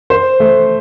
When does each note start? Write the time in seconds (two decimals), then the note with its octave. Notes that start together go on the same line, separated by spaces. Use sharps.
0.10 C5
0.40 A3